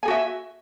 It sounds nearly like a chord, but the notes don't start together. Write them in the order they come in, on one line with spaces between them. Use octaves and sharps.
G#5 G#4 F#4 E5